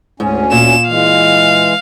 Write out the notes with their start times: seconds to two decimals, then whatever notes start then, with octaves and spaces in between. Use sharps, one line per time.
0.20 D2 G#2 C#4
0.52 A#2 E7
0.88 E3 G#3 F5